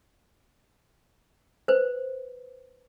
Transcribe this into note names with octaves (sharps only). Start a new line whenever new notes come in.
B4 C5